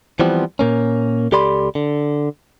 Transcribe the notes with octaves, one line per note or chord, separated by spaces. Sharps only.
E3 F3 G3 B3 C4
A#2 A#3 C#4
C#2 G4 A4 D5 B5 C6
D3